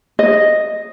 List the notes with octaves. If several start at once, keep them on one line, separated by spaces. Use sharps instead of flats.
D#5